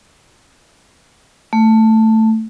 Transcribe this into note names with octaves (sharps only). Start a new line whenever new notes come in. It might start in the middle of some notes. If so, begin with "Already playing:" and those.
A3